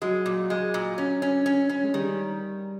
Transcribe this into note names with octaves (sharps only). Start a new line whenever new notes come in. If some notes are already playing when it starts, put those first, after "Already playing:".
F#3 G#3
A#2
G#3
A#2
C#4
C#4
C#4
C#4
G#3
D#3 G3